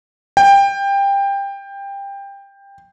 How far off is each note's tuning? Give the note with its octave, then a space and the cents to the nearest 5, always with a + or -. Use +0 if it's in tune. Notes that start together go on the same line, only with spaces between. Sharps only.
G5 +20